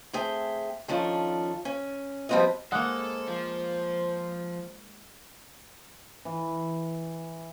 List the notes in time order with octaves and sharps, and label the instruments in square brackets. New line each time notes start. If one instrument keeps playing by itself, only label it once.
[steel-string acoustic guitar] A3 C4 G#4 E5 G5
D#3 F3 C#4 D4 F4 A4
C#4
F3 G3 B3 C4 F#4 D#5
[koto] G#3 A#3 [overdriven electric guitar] A4 [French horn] C5 [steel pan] F#5
[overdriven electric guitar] F3
[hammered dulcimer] E3